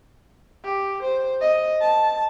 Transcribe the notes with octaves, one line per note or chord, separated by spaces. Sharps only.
G4
C5
D#5
A5